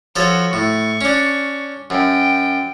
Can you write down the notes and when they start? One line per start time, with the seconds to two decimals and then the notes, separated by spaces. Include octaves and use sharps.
0.16 F3 F#4 A4 C#5
0.53 A2 C#6
1.01 C#4 D4
1.90 F#2 G5